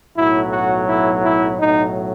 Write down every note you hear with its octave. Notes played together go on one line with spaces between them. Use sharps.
B1 A2 F#3 E4
F#4
E4
E4
B1 A2 F#3 D#4